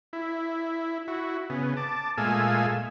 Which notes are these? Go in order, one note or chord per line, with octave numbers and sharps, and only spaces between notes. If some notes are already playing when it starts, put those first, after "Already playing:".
E4
E4 F#4
C#3 B3
A5 D6
A#2 G#3 A3 F5 G#5 E6